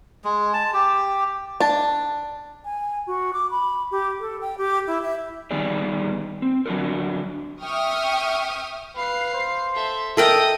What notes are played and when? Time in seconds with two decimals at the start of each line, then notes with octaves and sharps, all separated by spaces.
0.24 G#3
0.53 A5
0.73 G4
1.60 D4 A5
2.65 G#5
3.07 F#4
3.33 D6
3.51 B5
3.91 G4
4.20 A4
4.41 G5
4.58 G4
4.87 E4
5.02 E5
5.51 D#3 G3 B3 D#4 G#4 D5
6.42 C4
6.66 D3 F#3 D4 E4 F#4 A#4
7.62 E5 G5 C#6 D#6 F6
8.96 B4 F5 C7
9.34 C5
9.75 A4 E5
10.17 A4 A#4 D#5 E5 G5 D#6